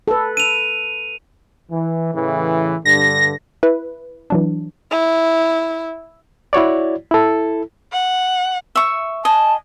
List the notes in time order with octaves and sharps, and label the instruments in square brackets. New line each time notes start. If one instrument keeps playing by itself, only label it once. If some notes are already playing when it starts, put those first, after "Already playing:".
[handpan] A4 B4
[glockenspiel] D#7 F7
[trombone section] E3
A2 C#3 E3
[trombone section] G2 D3 [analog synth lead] A#6
[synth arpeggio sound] E4 B4
E3 F#3 D4
[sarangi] E4
[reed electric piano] E4 F#4 C#5 D5
E4 A4
[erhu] F#5
[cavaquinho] E5 C#6
[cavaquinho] D#5 G#5 [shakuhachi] A5